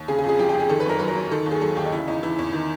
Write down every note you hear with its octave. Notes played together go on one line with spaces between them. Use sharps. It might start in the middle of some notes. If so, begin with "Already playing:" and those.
Already playing: D#2
C#3 G#4
G#4
F2
G#4
F3 G4
G4
F2
G#4
D#3 A4
B4
F#2 A#4
F#3 B4
A#4
F#2
D#3 A4
D#2
G#4
F#3 A4
D#2 G4
D#4
C#3 E4
E2 D#4
E3 E4
E2
D#3